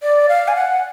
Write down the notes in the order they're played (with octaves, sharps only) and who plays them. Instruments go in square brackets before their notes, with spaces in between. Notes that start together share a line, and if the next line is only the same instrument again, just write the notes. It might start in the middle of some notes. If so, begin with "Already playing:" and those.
[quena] D5
F5
G#5
F#5